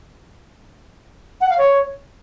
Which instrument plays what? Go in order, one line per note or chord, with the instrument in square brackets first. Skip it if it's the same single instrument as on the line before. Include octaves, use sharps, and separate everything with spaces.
[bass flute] F#5
F5
C#5